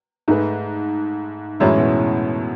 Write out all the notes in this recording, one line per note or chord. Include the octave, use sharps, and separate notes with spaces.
G#2 A3 D#4 G#4 B4
F#2 A2 E3 G#3 C#4 E4
B2